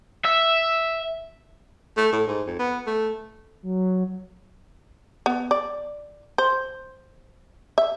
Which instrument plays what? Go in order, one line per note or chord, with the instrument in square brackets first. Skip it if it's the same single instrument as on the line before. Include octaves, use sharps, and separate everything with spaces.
[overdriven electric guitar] E5
[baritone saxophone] A3
A2
G#2
F2
B3
A3
[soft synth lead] F#3
[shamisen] B3
D5
C5
E5